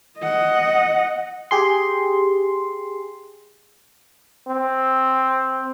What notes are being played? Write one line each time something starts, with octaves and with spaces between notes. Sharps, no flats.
D#5 F#5
G4 G#4 C6
C4